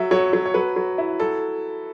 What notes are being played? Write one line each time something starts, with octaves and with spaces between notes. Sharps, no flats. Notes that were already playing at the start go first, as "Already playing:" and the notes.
Already playing: F#3 E5
F#3 C#5
F#3
C#5
F#3 B4
F#3
E4
F#3 A4